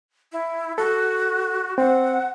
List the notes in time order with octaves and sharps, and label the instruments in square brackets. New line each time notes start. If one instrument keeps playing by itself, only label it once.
[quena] E4
[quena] F#4 [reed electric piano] A4
[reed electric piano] C4 [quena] F#5